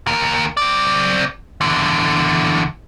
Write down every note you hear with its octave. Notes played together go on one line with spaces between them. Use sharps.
D#2 A#4
C4 D5
E2 D3